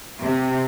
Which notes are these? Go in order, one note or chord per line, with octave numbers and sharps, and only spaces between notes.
C3